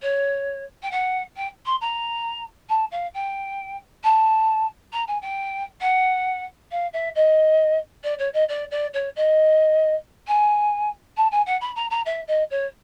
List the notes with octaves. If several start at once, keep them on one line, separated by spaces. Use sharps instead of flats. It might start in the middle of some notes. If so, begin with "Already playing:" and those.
C#5
G5
F#5
G5
C6
A#5
A5
F5
G5
A5
A#5
G#5
G5
F#5
F5
E5
D#5
D5
C#5
D#5
D5
D5
C#5
D#5
G#5
A5
G#5
F#5
B5
A#5
A#5
E5
D#5
C#5